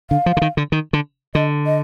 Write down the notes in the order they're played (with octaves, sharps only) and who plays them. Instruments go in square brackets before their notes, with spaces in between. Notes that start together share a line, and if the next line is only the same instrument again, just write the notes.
[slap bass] D3 [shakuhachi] F5
[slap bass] F3
D3
D#3
D3
D#3
D3
[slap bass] D3 [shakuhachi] D#5
[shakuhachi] D#5